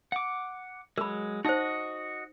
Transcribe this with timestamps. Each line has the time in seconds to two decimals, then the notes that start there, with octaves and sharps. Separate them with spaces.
0.12 F#5 D6
0.98 F#3 G#3 A#4 B5
1.45 D#4 F#4 C5 D#5 F#5